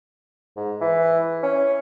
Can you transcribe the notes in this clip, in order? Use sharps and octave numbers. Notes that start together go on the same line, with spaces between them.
G#2
E3
C#4